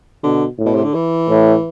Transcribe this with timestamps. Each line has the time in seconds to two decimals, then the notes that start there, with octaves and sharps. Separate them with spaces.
0.23 B2 D3
0.58 A2
0.66 B2
0.75 C3
0.84 D3
0.94 E3
1.29 A2